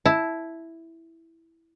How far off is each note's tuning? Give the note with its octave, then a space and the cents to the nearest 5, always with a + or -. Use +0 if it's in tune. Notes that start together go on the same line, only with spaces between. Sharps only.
E4 +0 A5 -10